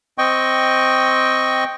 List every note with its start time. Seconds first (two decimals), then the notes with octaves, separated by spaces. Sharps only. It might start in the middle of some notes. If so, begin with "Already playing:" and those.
0.18 C4 D#5 G5 C#6